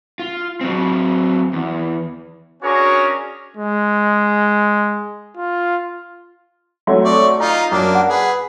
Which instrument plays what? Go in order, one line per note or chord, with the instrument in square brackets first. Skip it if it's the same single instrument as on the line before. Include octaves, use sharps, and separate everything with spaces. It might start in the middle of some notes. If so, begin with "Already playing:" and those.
[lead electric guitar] F4
F#3 C4
E2
[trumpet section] C#4 D4 F#4 G#4 A#4 C#5
[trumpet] G#3
F4
[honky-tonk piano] F#3 A3 C4
[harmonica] D5 C#6
[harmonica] D#4 F4 [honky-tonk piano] A#5
[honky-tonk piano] F#2 [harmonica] A#3 D4
[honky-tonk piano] F#5
[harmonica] G#4 B4